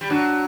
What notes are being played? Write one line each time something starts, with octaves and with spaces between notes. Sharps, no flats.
G3
F#3 D4